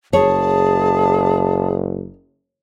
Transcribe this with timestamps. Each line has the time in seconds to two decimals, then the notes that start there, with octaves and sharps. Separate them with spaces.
0.13 F#1 G#4 C#5 A5